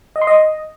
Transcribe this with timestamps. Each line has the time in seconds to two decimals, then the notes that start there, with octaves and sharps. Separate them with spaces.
0.16 D#5
0.21 C6
0.27 D#5